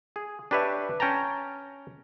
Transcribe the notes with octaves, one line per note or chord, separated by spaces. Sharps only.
G#4
D4 G4 B4 C#5 E5
C#4 G5 A5 A#5